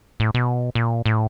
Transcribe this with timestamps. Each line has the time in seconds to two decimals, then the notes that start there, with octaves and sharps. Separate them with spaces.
0.20 A2
0.34 B2
0.75 A#2
1.06 A2